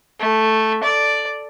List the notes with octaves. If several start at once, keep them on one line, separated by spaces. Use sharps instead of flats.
A3
D5